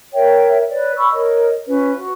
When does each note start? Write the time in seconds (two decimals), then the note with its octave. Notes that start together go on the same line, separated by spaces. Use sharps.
0.13 A#4 C#5 E5 G5
0.69 B4 C#5 D5
0.96 B5 C#6 E6
1.11 A#4 C#5 D#5
1.66 C#4 F4 B4
1.94 F#4